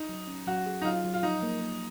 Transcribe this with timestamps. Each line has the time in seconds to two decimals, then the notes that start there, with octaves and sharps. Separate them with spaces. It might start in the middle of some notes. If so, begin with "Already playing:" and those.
Already playing: D#4
0.09 F#3
0.27 C#4
0.47 F#3 F#4
0.66 G#4
0.82 D#4
0.85 F#3 F4
1.04 F#3
1.14 F4
1.23 F3 D#4
1.43 A#3
1.61 A#3